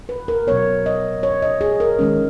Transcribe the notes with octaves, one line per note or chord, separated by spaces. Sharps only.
B4
A#4
B2 F#3 B3 C#5
D#5
C#5
D#5
G#4
A#4
D#3 G#3 C#4